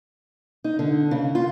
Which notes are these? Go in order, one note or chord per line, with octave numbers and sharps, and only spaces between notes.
D#4
D3
C#3
F4